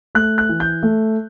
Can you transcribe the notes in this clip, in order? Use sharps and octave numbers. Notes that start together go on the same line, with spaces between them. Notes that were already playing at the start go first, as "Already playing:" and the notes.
A3 F#6
F#6
E3
G6
A3